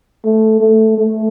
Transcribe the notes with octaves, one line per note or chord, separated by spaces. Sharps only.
A3
A3
A3